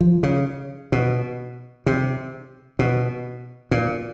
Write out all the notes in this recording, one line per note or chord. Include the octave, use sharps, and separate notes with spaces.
F3
C#3
B2
C3
B2
A#2